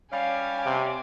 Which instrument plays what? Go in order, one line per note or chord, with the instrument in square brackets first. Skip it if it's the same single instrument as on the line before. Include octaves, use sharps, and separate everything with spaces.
[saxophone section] G3 C#4 F5 [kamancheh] G#5 D6
[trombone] C3